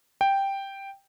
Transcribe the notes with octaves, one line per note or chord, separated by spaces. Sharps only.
G5